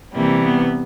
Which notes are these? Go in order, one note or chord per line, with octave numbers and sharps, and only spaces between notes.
C3 E3 G3 A#3
B3